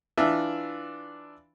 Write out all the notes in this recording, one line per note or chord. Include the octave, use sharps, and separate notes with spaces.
E3 D4 F4 E5